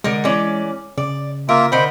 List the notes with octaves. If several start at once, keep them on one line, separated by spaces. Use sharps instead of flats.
D3 G#3 A#4
E3 C#4 D5
C#3 D5
A#3 F4 A#4 E5
D3 A#4 C5 D#5 B5